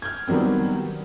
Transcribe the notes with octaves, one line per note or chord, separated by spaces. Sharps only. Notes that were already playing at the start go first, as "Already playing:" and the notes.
F6 G6 G#6
D#3 F#3 G3 B3 C4